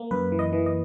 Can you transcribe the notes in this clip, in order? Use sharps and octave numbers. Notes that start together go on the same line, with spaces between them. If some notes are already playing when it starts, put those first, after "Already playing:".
Already playing: A#3
F#2 B4
E3
D#5
E3
D#5